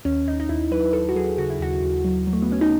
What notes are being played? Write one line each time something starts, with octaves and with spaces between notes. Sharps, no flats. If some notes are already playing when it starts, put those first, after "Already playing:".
D#2 C#4
D#2 D#4
D#4
D#2 E4
F#3 B4
D#2 A4
F#4
F#3 G#4
C#3 F#4
E4
D#2 F#4
D#2
F#3
F#3
A3
B3
C#3 C#4
D#4